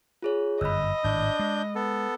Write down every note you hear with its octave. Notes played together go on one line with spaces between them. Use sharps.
F4 G#4 C#5
G1 F#2 D#5 B5 E6
G#1 A2 D4 G6
G#3
B3 A4